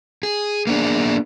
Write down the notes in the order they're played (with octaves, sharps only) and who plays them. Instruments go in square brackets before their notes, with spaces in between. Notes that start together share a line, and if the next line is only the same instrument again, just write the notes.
[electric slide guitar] G#4
A#3 B3 D4 G#4